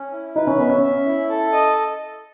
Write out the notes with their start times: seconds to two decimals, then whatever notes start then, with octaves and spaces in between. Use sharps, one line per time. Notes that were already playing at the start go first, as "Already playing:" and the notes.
Already playing: C#4
0.12 E4
0.36 D#4 B4
0.47 C#4
0.58 B3 E5
0.69 C#4
0.83 E5
1.06 E4
1.29 A4
1.52 D#5